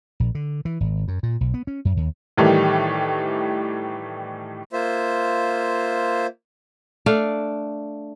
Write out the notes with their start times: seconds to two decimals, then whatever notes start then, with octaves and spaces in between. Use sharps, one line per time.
0.20 A#1
0.35 D3
0.65 E3
0.80 G#1
1.08 F#2
1.23 A#2
1.41 B1
1.54 B3
1.67 C#4
1.85 F#2
1.97 D#2
2.37 A2 D#3 E3 G3 A3
4.73 A#3 F4 C5 E5
7.06 A3 D4 D5 F5